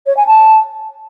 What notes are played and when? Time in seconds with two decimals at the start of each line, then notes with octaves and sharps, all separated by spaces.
0.06 C#5
0.16 G#5
0.26 A5